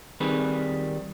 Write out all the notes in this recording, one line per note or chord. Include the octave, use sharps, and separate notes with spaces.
D#3 G3 C4 G#4 B4